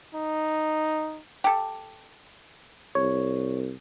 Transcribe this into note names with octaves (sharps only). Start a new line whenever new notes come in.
D#4
G4 A4
C2 C#5